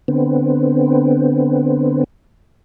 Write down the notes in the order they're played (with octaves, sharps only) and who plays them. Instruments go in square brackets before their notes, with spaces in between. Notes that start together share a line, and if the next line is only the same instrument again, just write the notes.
[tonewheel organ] D3 B3 C4